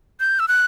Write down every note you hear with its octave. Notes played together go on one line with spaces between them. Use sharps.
G6
E6
F#6